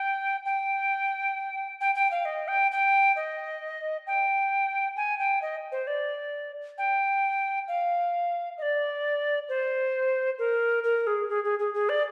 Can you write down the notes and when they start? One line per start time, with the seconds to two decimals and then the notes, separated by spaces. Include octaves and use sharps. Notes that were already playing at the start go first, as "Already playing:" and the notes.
Already playing: G5
0.45 G5
1.81 G5
1.95 G5
2.11 F5
2.25 D#5
2.48 G5
2.71 G5
3.16 D#5
4.07 G5
4.97 G#5
5.19 G5
5.42 D#5
5.72 C5
5.87 D5
6.78 G5
7.68 F5
8.58 D#5
8.62 D5
9.49 C5
10.39 A#4
10.84 A#4
11.07 G#4
11.29 G#4
11.44 G#4
11.59 G#4
11.74 G#4
11.89 D5